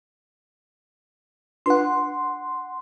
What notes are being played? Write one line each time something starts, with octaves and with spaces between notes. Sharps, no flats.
D4 F4 B4 F#5 C6